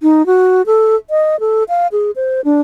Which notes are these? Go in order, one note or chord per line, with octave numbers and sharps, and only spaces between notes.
D#4
F#4
A4
D#5
A4
F5
G#4
C5
D4